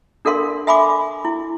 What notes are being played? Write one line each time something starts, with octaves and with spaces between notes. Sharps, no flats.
D4 A4 A#4 F5 C6
E5 G#5 B5 C6 D6
E4